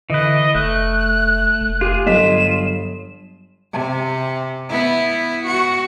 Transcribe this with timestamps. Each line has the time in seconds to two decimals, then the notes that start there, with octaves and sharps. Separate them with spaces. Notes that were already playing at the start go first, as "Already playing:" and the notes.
0.10 D3 E3 B4 D#5
0.55 F1 A3 F#6
1.60 F1
1.81 F4 G4 G#4
2.06 G1 F#3 D#5 B6 E7
3.73 C3
4.70 B3 E4
5.47 F#4